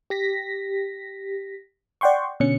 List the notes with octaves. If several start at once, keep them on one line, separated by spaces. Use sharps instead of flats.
G4 A#6 B6
D5 F#5 G5 C6 C#6
B2 D3 C#4 C#7